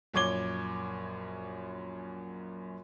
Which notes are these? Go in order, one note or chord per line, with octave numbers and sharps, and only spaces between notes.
A#1 F#2 C#5 D6 G#6 G7